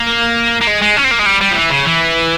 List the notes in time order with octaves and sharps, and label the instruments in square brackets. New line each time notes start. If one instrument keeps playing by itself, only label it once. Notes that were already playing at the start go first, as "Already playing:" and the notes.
Already playing: [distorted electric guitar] A#3
A#3
G#3
G#3
C#4
C4
A#3
G#3
G3
G3
F3
E3
C#3
E3